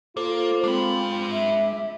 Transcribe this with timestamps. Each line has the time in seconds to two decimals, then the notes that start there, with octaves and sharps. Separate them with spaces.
0.17 A#3 F4 A4 C5
0.64 G#3 C4 D4 B5
1.31 E5